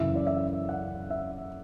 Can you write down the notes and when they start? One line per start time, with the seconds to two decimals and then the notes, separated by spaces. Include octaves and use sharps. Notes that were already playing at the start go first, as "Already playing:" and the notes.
Already playing: F#2 C#3 E3 E5
0.16 D5
0.27 E5
0.69 F#5
1.10 E5